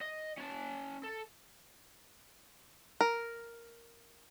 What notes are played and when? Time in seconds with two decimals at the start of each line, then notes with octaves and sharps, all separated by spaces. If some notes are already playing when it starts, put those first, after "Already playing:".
0.01 D#5
0.38 C#4 A5
1.03 A4
3.01 A#4